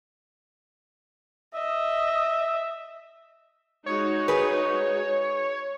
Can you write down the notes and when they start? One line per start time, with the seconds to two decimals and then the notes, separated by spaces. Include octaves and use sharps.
1.54 D#5 E5
3.86 G#3 D#4 F#4 C#5
4.28 G#4 B4